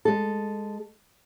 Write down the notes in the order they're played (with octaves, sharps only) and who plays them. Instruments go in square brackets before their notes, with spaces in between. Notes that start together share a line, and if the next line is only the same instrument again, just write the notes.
[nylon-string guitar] G#3 A4